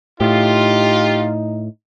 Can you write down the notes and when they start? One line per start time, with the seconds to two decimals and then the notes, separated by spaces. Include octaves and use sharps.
0.21 A2 D#4 F4 G4